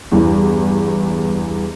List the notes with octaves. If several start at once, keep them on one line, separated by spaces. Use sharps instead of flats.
E2 G2 E3